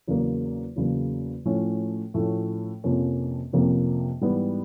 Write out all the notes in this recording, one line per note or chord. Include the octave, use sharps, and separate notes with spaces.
E2 C#3 F#3 A#3
E2 C#3 F#3 A#3
A2 F3 A3 C#4
A2 F3 A3 C#4
F2 C3 F3 A#3 C#4
F2 C3 F3 A#3 C#4
G#2 E3 G3 B3